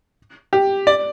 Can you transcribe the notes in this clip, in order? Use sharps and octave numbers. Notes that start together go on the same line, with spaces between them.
G4
D5